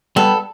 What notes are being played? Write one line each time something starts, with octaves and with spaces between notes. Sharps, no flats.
G3 B3 A4